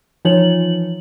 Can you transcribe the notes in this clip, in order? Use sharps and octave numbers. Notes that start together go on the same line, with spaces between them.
E3 F3 D#4 F4 C#5 F#7